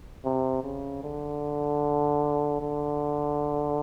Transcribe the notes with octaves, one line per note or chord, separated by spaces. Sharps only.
C3
C#3
D3
D3